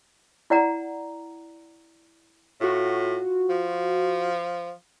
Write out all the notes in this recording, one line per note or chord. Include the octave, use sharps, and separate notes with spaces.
E4 D5 F#5 A#5
A2 F4 F#4
F3